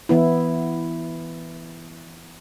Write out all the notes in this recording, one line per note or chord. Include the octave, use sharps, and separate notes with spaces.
E3 B3 E4